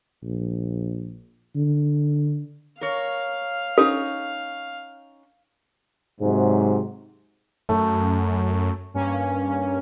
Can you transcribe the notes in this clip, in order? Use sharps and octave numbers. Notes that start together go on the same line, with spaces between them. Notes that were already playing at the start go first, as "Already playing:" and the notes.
A#1
D3
A#4 C#5 F5
C#4 D#4 A4
G#2 C3 F#3
F#2 A3
G2 A#3 C#4